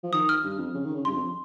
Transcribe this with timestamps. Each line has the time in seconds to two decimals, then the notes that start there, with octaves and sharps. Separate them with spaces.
0.03 F3
0.13 D#3 D#6
0.29 F6
0.44 G2
0.59 F2
0.74 C#3
0.84 D#3
0.94 C#3
1.05 G2 C6
1.14 F2